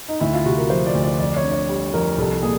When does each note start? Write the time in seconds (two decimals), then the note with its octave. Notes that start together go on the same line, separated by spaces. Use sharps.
0.08 D#4
0.21 D2 E4
0.33 F4
0.45 C3 F#4
0.58 A#4
0.70 F3 C5
0.86 D5
0.95 D2
1.03 D5
1.19 F2 D5
1.36 C#5
1.44 D3
1.52 C#5
1.69 G3
1.93 F2 A#4
2.18 C2 A4
2.43 A#2 G#4